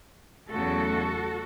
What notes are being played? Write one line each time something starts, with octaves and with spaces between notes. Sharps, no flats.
E2 C#3 F#3 A3 F#4 A4